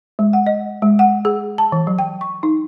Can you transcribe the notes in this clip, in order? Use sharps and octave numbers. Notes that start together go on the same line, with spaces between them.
G#3
F#5
D#5
G#3
F#5
G#4
A5
E3
F#3
G5
C#6
D#4